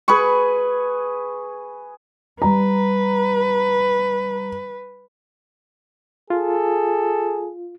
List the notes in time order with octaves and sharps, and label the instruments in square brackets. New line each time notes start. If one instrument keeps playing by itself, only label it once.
[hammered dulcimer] G#4 B4 B5 C#6
[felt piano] G3 A#5 [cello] B4
[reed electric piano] F4 [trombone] G#4 [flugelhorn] A4